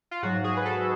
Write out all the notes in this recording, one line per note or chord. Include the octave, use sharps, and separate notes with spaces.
F4
G#2 F#3 F#4
G#4
B4
A4